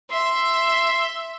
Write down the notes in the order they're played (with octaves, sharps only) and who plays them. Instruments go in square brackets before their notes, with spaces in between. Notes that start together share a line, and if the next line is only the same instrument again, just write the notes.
[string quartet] E5 [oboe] C6